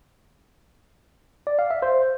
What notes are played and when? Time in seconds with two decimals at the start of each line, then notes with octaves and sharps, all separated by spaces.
1.47 D5
1.59 F5
1.71 E5
1.82 C5